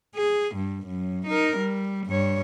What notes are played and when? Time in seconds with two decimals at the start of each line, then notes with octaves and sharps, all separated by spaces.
0.16 G#4
0.56 G2
0.87 F#2
1.27 D#4 A#4
1.58 G3
2.07 G2 C#5